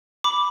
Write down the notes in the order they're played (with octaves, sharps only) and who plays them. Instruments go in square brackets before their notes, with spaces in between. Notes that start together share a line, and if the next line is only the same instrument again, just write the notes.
[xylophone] B5 D6